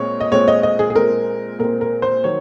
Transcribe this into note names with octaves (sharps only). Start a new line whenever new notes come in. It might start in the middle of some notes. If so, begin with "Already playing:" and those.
Already playing: A#2 G#3 C4 C#5
D#5
A#2 G#3 C4 C#5
D#5
D#5
G#4
G#4
A#2 G#3 C4 A#4
A#2 G#3 C4 A#4
A#4
C5
D#3 F#3 C#5